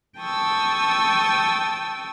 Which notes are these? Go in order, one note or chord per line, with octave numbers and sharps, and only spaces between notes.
G5 A5 C#6 D#6 E6